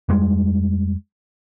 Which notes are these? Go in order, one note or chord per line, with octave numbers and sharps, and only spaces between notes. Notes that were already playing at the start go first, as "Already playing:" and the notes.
F2 G3 G#3